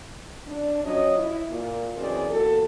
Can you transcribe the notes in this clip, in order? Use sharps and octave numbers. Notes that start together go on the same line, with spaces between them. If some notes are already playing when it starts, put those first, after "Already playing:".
D4
F3 F#3 C#4 C#5 D#5
E4
A#2
F#2 B2 E3 C4 G#4 D5
E2 A#2 F#4 A4